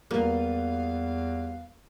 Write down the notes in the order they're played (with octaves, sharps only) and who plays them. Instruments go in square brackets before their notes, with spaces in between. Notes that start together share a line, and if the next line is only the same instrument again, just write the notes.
[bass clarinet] E2 [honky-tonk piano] G3 B3 F4 [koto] A#3 [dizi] F5